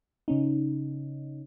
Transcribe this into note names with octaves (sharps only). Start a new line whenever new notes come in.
C#3 C#4 D#4